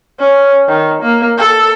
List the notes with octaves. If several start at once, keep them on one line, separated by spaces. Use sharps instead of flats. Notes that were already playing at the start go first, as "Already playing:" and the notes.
C#4
D#3
A#3
A4